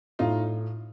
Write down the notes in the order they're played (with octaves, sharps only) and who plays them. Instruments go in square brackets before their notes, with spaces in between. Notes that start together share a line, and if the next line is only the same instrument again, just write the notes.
[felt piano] A2 [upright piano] D#4 F4